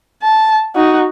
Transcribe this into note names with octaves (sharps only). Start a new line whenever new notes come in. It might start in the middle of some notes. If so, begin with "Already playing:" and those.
A5
D#4 F#4